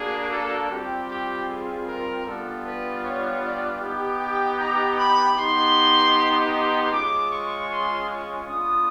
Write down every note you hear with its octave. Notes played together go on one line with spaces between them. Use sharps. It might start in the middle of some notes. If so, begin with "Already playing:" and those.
Already playing: A#3 D4 F#4 G#4
A4
G3 C4 F4 G4
G4
G#4
A#4
G3 B3 D4 F4 A4
B4
C#5
D5
B3 D#4 G4
G5
A#5
B5
B3 D#4 G4 C6
C6
G#3 C#4 F4 D6
C#6
C6
C#6
B3 D4 F4 D#6